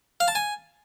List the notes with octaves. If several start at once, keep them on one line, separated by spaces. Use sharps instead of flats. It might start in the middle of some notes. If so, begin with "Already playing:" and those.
F5
A5
G#5